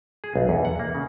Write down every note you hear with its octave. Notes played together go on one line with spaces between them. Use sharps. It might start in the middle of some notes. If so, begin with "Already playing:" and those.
G#4
B1
E2
F#5
A#3
C#3